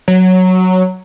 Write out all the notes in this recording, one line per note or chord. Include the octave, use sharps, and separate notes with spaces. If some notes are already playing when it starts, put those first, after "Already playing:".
F#3